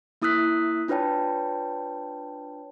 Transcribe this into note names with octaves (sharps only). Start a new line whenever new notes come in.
A#3 E4 D#6 E6 F#6 B6
D4 F4 B4 C#5 G5 A5